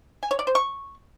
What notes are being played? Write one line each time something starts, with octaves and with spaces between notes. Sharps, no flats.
G#5
C#5
D5
C5
C#6